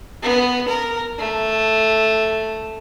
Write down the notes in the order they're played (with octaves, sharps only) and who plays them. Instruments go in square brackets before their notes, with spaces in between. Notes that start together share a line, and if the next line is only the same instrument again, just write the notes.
[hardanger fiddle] B3
A#4
A3